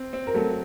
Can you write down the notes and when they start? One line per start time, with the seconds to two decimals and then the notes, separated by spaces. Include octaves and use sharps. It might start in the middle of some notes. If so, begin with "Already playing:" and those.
Already playing: C4
0.13 C4
0.27 A#4
0.34 F#3 A3 A4